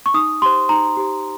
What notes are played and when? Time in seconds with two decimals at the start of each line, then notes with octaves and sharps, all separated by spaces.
0.06 C#6
0.14 D#4 D#6
0.42 G4 C5 C6
0.69 D#4 A#5
0.97 G4 C5